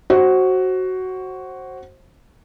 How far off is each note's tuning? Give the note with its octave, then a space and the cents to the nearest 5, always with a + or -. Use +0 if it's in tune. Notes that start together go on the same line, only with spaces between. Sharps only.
F#4 +10 C5 +25